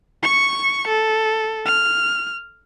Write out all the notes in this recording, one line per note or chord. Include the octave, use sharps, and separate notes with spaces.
C#6 C#7
A4
F6